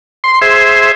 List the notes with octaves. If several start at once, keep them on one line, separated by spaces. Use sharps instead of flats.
C6
G#4 C5 E5